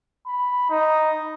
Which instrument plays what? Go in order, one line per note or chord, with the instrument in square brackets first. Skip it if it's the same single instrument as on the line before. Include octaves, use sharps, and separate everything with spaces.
[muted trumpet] B5
D#4